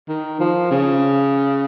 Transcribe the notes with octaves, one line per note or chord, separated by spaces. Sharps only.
D#3
F3
C#3